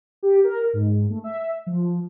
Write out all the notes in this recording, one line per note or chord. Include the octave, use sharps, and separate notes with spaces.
G4
A#4
G#2
A3
E5
F3